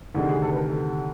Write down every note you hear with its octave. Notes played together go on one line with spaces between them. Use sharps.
D2 C3 D#3 G#4
G#4
A4
B4
A#4
A4